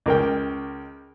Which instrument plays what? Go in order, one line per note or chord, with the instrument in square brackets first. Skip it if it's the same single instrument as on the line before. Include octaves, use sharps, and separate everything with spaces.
[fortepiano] C#2 A#4 G5